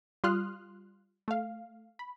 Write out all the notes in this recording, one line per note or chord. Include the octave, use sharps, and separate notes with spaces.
G3 F4 C6 D#6 F6 F#6
A3 F5
B5